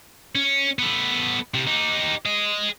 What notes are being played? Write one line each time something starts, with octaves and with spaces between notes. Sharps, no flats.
C#4
B3 A4
C3 G3
D#4 G4
G#4 D#5